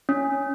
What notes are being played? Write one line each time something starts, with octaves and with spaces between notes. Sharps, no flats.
C#4